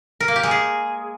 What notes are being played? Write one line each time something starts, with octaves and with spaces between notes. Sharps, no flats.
A#4
A#3
G4
G#3
G#4